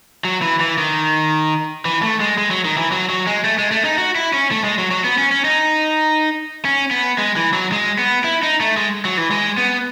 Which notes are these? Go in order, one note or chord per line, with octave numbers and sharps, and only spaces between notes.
F#3
E3
E3
D#3
E3
A3
G#3
G#3
F#3
D#3
E3
F#3
F#3
G#3
A3
G#3
A3
D#4
F#4
E4
C#4
A3
G#3
F#3
F#3
B3
C#4
C#4
D#4
C#4
B3
G#3
E3
F#3
G#3
B3
E4
D#4
A3
G#3
F#3
E3
G#3
B3